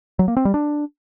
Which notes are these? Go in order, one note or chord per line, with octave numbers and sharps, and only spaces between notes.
F#3
A#3
C4
G3
D4